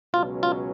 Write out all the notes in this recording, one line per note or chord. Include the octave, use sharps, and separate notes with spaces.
C#2 B2 F#3 C#4 F4
F4